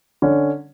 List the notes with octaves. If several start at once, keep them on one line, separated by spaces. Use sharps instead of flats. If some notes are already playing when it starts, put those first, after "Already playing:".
D3 C#4